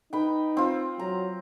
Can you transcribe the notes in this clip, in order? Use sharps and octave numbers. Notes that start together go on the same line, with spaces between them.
D#4 B4 G5
C4 F4
F#3 A#5